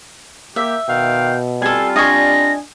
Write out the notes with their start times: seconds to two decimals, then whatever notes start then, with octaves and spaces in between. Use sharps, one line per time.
0.56 A#3 G4 E5
0.89 B2 D#3 F5 G5
1.62 G3 C4 F4 A4 G#5
1.96 D4 D#5 G#5 C#6 A#6